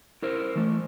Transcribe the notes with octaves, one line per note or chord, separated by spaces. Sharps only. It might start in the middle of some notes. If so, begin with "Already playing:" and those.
E4 A#4 C5
E3 A3